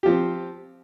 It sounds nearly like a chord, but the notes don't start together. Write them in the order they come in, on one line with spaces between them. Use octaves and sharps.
G4 F3 C4